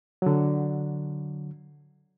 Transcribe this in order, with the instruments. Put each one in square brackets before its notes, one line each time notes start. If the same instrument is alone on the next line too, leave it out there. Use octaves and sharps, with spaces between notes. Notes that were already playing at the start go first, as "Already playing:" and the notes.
[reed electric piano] D3 F#3